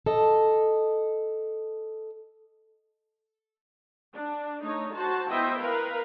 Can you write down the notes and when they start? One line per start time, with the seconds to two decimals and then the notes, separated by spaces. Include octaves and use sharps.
0.06 A4 D#5
4.14 D4
4.62 A3 D#4 C#5
4.95 F#4 C5 A5
5.29 B3 E4 C5 D#5 E5 G5
5.61 A#4 B4 F5